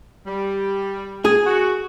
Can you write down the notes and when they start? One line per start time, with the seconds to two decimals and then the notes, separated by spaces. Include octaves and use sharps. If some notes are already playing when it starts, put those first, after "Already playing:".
0.25 G3
1.25 G#4
1.45 F#4